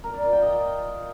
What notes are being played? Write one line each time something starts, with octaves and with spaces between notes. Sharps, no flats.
A#4
D5
F4
G5
D#5